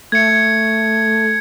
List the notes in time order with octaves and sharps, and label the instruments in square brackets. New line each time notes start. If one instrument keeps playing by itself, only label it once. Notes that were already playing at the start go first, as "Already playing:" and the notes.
[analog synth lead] A3 [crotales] G#6 C#7